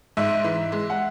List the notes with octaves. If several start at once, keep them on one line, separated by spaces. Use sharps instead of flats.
G#2 E5
E3
G#3
F#5